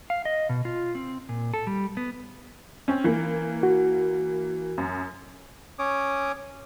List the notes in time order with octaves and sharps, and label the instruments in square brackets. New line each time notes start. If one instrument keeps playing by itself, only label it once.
[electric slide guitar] F5
D#5
B2
F4
C4
A#2
A4
G3
B3
[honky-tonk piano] C4 C#4
E3 A#3
[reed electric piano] F#4
[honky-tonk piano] F#2
[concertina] C#4 C#5 D6 D#6